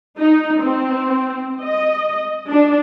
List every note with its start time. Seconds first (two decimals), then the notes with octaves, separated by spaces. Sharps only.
0.18 D#4
0.62 C4
1.63 D#5
2.49 D4